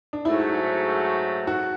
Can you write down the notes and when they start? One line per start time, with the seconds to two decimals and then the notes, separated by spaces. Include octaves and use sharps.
0.13 D4
0.25 G#2 F#3 A3 E4
1.47 F#4